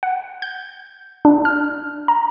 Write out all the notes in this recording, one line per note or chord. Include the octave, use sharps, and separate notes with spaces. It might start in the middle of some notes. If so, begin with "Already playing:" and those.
F#5
G6
D4
F6
A#5